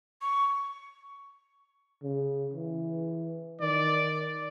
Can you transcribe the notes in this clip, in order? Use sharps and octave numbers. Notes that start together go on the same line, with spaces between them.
C#6
C#3
E3
D#3 D5